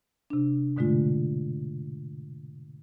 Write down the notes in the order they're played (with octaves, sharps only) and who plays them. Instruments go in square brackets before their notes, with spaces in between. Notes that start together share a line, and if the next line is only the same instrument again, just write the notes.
[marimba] C3 D4
G#2 B2 D3 G#3 A3 F4